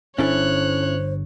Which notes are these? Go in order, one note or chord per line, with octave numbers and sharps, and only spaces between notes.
G1 C#4 D4 E4 A4 C5 C#5 F#6